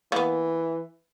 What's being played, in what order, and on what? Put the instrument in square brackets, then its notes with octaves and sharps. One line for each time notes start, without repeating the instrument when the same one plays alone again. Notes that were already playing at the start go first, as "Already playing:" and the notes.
[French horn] E3 [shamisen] A#3 B3